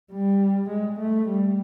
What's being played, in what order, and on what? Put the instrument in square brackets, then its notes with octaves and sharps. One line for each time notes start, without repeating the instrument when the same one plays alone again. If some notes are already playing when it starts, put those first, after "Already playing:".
[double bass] G3
G#3
A3
G3